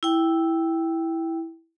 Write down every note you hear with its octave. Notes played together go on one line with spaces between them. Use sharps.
E4 G5